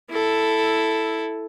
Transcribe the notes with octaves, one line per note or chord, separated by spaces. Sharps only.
E4 A4